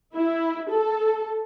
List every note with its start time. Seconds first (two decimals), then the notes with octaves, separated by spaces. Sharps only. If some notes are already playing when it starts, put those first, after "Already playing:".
0.15 E4
0.70 A4